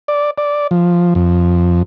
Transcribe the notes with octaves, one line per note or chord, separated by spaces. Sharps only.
D5
D5
F3
F2